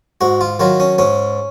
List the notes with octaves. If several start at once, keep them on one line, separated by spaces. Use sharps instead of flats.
G#2 F#4
F4
D#3 F#3 F4
C#4
G#2 C#4